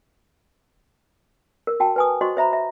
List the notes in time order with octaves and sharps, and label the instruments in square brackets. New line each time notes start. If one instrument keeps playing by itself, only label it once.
[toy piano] A#4
F#4 G5 A5
B4 G#5 D#6
F#4 C5 D#5 C6 C#6
C5 E5 A#5 B5
E5